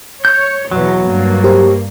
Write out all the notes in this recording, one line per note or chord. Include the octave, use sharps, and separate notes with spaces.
C#5 G6
E2 B2 F#3
G2 A#3
G4 A#4 C5